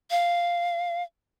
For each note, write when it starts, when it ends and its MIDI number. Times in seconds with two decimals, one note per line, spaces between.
0.11 1.03 77